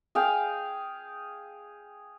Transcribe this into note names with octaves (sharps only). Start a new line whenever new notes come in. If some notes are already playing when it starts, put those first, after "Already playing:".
G#4 F5 G5